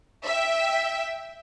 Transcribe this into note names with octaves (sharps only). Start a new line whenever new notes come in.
E5 G5